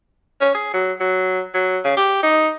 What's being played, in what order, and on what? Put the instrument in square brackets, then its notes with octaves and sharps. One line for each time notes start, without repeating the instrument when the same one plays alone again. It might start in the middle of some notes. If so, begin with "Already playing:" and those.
[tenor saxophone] C#4
G#4
F#3
F#3
F#3
C#3
G4
D#4